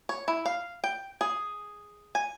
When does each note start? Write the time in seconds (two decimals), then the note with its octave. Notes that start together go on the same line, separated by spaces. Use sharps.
0.09 C#5
0.28 E4
0.46 F5
0.84 G5
1.21 G#4
2.15 G#5